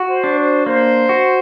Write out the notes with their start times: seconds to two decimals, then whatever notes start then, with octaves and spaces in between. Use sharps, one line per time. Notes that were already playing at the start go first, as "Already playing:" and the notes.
Already playing: F#4
0.10 C5
0.24 D4
0.38 C5
0.66 A#3 C5
1.09 F#4